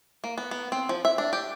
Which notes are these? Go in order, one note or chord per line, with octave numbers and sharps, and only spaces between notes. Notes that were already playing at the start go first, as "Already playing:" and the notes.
A#3
B3
B3
C4
F3
E5
D4
G4